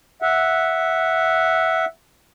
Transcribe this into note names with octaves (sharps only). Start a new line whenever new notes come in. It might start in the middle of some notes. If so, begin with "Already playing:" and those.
E5 F#5